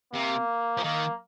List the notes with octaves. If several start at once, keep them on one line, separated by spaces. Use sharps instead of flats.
C3 A#3
F3
D#3 A#3